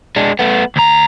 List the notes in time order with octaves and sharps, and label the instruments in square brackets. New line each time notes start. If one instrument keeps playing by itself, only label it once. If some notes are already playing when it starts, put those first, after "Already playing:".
[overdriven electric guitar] G#3 D4
A3 B3
D2 A#5